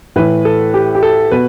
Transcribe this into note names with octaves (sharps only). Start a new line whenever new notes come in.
A2 E3 B4
A4
G4
G4
A4
B2 B4